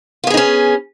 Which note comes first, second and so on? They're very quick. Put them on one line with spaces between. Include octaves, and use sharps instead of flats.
F4 B3 G#4 D#4 C#4